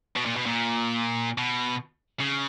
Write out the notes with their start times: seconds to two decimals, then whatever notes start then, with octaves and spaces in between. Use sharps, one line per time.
0.16 B2
0.26 A#2
0.36 B2
0.46 A#2
1.38 B2
2.20 C#3